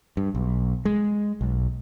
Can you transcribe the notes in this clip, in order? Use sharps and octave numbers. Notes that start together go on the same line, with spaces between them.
G2
B1
G#3
B1